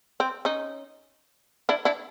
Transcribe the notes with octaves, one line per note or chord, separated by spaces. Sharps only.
C4
C#4 D#4
D4 E4
D4 E4